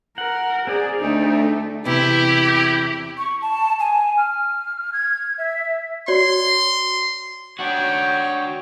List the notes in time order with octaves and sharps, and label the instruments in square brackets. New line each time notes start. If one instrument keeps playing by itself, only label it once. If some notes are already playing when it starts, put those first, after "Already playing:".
[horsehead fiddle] A#4 [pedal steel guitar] F#5
[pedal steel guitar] C4 A#4 D5 [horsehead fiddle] G#4
[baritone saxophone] D2 [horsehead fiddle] A3 D#4
[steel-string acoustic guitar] E2 C3 [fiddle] E4 [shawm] G4
[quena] C#6
A5
G#5
F6
G#6
E5
[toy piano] F#4 C#5 D5 [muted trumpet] C6
[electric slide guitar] D4 F#4 [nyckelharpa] C#5 G5